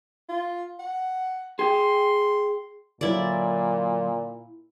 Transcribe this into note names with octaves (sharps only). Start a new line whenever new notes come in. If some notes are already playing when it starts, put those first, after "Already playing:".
F4
F#5
G#4 G5 C6
A#2 D3 F#3 E4 D5